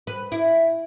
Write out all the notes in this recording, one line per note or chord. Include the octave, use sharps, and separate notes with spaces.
B4
E4